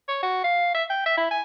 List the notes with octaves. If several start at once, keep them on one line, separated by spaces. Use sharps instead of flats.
C#5
F#4
F5
E5
G5
E5
E4
G#5